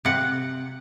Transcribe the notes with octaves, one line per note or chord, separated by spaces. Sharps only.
C3 F#5